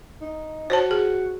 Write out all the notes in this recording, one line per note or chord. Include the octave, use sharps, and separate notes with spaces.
D#4
F#4 C5 C#5 A5
G#4